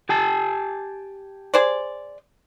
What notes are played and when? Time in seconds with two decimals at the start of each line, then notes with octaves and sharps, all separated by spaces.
0.09 G4 G#5 A5
1.54 G#4 C5 D5